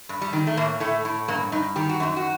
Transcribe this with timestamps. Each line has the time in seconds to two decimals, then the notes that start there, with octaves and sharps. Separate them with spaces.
0.09 G2
0.22 G3
0.33 D#3
0.47 A3
0.57 A2 A#3
0.80 A2 A3
1.05 A2
1.28 G2 A#3
1.52 G2 D#4
1.76 D#3 G4
1.89 F#4
2.00 F#2 D#4
2.16 F#4